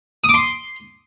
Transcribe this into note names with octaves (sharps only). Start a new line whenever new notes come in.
D#6
D6
C6